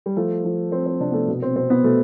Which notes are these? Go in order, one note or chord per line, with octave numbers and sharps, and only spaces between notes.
G3
F3 A3
F3
F3 C4
C4
C3 D4
B3
A3
B2 B3
C4
B2 C4
B3
B2 A3